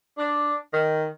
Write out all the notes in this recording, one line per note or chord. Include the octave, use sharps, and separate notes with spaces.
D4
D#3